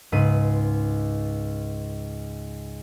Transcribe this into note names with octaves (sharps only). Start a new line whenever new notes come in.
C#2 G#2 B4 D#7